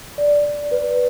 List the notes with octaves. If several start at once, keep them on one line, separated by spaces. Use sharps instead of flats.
D5
D5
B4